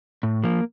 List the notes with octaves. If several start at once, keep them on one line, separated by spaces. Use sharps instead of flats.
A2
F3 A#3